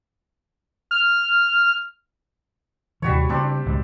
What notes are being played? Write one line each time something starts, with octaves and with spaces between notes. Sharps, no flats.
F6
D#2 C3 E3 G3 F#4 C#5
C#3 A#3 C4 D4 G4
G#1 C#2 F#2